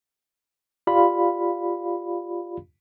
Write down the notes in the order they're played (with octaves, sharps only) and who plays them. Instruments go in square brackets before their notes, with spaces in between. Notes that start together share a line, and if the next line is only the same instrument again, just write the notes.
[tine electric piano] F4 G4 D5 F5 B5